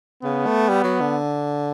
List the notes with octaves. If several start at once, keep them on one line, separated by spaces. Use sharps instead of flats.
C#3 B3
A3
G3
F#3
D3